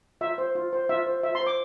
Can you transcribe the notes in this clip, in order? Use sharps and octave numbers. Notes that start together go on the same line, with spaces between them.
F4 E5
C5
F4
C5
F4 E5
C5
F4 E5
C6
C5
D6